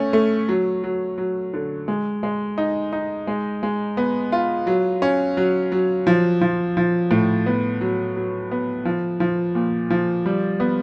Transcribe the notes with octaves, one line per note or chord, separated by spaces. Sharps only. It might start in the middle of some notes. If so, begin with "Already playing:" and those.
Already playing: A3 C#4
A3
F#3
F#3
F#3
D3
G#3
G#3
D#4
D#4
G#3
G#3
B3
F4
F#3
C#4
F#3
F#3
F3
F3
F3
A2
B3
F#3
F#3
B3
F3
F3
A#2
F3
G3
B3